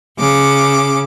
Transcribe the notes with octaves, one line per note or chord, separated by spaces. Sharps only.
C#3 D6